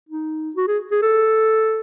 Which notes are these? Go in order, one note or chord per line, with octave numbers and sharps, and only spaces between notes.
D#4
F#4
G#4
G#4
A4